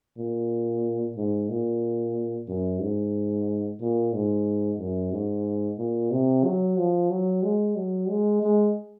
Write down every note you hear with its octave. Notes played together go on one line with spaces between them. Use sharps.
A#2
G#2
A#2
F#2
G#2
A#2
G#2
F#2
G#2
A#2
C3
F#3
F3
F#3
G#3
F#3
G#3
G#3